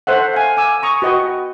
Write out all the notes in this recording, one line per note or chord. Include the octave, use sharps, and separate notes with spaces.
A4 C5 E5 F#5
F5 G#5
G#5 D6 E6
A#5 C#6 D#6
F#4 B4 D#5 G5 C#6